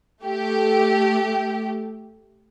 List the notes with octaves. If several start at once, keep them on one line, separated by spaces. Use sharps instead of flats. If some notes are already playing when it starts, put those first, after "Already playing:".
A3 G4